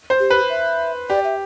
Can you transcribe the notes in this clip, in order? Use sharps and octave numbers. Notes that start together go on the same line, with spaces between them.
C5
G4
B4
E5
G4 D5
E5